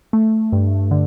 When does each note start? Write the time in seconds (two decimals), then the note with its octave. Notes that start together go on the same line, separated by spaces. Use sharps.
0.13 A3
0.52 G2
0.91 D3